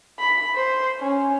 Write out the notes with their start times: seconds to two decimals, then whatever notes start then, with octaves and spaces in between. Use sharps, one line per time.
0.19 B5
0.55 C5
1.01 C#4